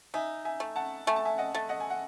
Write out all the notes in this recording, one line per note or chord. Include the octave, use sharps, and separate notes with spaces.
D#4 E5 G#5
E5 G#5
A3
F#5 A5
A3 G#5
A5
E5 G#5
D#5 F#5
A3
D#5 F#5
G#5
F#5